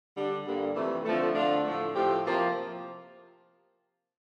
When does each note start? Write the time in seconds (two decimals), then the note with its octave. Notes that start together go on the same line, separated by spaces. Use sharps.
0.14 D3 G3 D4
0.46 G2 D3 G3 A#3
0.76 F2 C3 E3 A3
1.05 F2 D3 F3 A3
1.34 D3 A3 D4 F4
1.64 A2 F3 A3
1.95 A2 F3 C4 G4
2.25 C3 F3 A#3 F4